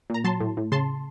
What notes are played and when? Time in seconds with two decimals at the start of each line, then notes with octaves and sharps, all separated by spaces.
0.10 A#2 A#5
0.24 F#3 A5 C6
0.40 A2
0.57 A2
0.72 C#3 A5 C6